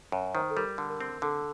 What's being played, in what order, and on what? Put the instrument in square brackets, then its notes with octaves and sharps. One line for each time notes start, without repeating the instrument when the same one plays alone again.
[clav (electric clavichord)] F#2
[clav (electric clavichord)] D#3 [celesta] C5
[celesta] A4
[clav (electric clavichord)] G3 [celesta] A#4
[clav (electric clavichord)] D3
[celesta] A#4
[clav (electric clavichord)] C4
[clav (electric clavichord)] D3 [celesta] A4